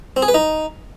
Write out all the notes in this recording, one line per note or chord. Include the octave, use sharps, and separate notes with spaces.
C4
G#4
B4
D#4